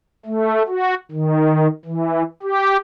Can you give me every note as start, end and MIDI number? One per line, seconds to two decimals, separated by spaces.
0.26 0.63 57
0.67 0.94 66
1.11 1.68 51
1.85 2.23 52
2.43 2.77 67